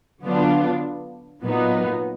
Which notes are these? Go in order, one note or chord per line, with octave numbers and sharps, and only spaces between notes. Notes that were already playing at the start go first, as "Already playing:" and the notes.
D3 F#3 B3 D4 F4
A#2 F#3 B3 D#4